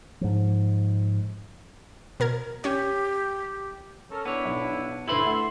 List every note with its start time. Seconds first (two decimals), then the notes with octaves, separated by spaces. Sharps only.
0.21 G#2 F3
2.20 B2 A#4 G#6
2.64 C#4 G4 C#5
4.11 C#4 A4 A#4
4.25 B3 D4 E4 C#5
4.45 B1
5.08 D2 E4 A4 B4 E5 B5 C6 F#7
5.25 A3 F#5